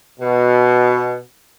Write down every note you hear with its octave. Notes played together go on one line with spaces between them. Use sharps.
B2